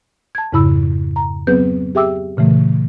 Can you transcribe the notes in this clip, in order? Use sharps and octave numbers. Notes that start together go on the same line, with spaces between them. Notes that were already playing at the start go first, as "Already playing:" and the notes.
A5 G#6
F2 G#2 C#3 E4 B5 E6
A#5
F#3 B3 C4 G#4 B4 G6
G4 G#4 E5 G5 D6 E6
A#2 C#3 E3 A3